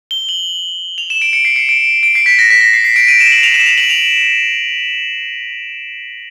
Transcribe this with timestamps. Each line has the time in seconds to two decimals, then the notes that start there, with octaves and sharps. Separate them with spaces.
0.11 G7
0.29 F#7
0.98 F7
1.10 E7
1.22 D7
1.33 C#7
1.45 C7
1.56 C#7
1.69 D7
2.03 D7
2.15 C7
2.26 B6
2.39 A#6
2.50 B6
2.61 A#6
2.73 C7
2.84 C7
2.96 D7
3.08 D#7
3.20 E7
3.32 F#7
3.43 F7
3.54 E7
3.66 F7
3.78 F#7
3.90 F7